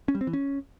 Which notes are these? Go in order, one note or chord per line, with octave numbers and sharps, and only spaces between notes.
C#4
G3
C4
E3
C#4